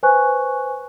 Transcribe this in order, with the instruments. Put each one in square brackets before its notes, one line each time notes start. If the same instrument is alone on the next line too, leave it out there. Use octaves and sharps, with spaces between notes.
[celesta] B4 C5 G#5 C#6 F#6